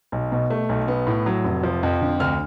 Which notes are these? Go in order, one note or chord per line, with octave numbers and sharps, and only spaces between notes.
B1
B2
A3
B1
B3
A2
F#3
F1
F3
F2
D3
D2 F6